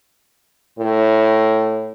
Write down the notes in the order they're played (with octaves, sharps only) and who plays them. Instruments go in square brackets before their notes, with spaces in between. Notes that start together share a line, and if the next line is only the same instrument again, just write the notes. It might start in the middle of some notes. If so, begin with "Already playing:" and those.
[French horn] A2